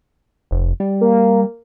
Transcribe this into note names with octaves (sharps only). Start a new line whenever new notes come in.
F1
G3
A#3